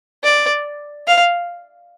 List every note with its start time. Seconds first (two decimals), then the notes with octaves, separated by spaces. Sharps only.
0.24 D5
1.07 F5